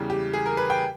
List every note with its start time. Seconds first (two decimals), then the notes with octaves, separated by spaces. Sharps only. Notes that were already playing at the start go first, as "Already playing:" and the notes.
Already playing: E2 C#3 E3 G3
0.10 G4
0.33 G#4
0.46 A#4
0.57 B4
0.70 G5